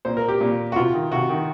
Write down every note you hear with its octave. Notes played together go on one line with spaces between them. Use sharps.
A#2 C5
A#4
G4
A#2
F#4
C3 F4
D#3
C3 F#4
D#3